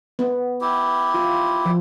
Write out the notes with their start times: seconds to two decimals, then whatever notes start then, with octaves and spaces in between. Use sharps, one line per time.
0.19 B3
0.61 E4 G4
1.14 F4
1.65 F3